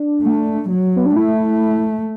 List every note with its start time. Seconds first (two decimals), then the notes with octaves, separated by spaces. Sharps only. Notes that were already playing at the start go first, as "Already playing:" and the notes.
Already playing: D4
0.22 A3
0.69 F#3
0.96 B3
1.06 D4
1.15 A3 E4